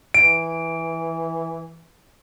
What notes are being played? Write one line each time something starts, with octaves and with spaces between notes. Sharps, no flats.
E3 D7